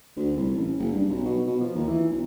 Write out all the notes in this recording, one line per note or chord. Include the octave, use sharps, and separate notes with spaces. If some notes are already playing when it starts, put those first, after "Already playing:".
D2
C2
A1
F#1
G2
B1
B2
B2
F3
D#2
E3
B1